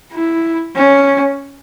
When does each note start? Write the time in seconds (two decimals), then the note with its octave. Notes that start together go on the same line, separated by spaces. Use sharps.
0.13 E4
0.76 C#4